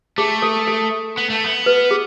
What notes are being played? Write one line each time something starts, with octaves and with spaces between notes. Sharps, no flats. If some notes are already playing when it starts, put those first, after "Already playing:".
A3 G#4
A4
A4
B3
A3
B3
B4
G#4